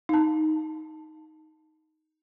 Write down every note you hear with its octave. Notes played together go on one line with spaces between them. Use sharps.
D#4 A5